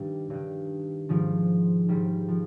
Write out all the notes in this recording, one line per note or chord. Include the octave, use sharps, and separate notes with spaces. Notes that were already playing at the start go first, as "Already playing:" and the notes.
Already playing: G2 D#3 G3
G2 D#3
G#2 D#3 F3
G#2 D#3 G3
F3